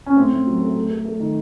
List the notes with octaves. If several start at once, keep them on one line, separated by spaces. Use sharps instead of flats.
C#4
A2 C4
A2
F#3
A3
A3
A3
A3
D#3